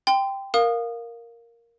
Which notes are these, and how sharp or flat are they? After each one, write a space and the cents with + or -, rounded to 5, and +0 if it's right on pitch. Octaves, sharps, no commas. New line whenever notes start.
G5 +0 C6 -30
A#4 +0 F5 +10 D#6 -20